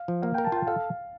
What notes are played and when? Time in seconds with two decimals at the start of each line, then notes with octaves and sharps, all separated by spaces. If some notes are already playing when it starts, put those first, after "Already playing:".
Already playing: F5
0.08 F3
0.22 A#3 F5
0.34 G5
0.38 A#4
0.45 A5
0.52 F4 G5
0.67 A4 F5